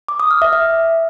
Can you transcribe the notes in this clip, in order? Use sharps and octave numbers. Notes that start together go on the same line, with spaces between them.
D6
D#6
F6
E5
E5